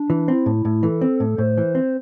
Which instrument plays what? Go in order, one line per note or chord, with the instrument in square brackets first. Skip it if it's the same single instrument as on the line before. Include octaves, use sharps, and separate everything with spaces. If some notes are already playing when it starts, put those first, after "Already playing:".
Already playing: [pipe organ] D4
[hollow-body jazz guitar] E3
[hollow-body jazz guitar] C4 [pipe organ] E4
[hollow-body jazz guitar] A2
A2
[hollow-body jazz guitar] E3 [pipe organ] A4
[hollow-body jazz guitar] C4
A2
[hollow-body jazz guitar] A2 [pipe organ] C5
[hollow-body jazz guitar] E3
C4